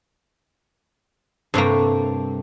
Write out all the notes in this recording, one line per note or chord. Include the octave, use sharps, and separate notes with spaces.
G2 C3 A3 A#3